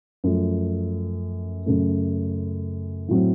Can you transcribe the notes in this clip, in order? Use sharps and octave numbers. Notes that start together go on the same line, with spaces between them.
F#2 F3 A3
F#2 C#3 A3
A2 F#3 C4 F#4